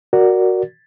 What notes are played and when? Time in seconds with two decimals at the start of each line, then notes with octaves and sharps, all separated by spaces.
0.13 F#4 A#4 D5